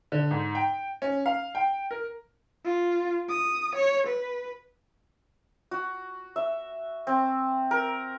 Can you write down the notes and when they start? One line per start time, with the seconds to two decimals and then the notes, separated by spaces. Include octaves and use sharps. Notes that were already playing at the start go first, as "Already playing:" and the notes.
0.12 D3
0.31 G#2
0.55 G5
1.02 C#4
1.26 F5
1.55 G5
1.91 A#4
2.65 F4
3.29 D#6
3.76 C#5
4.07 B4
5.71 F#4
6.36 E5
7.07 C4
7.71 A#4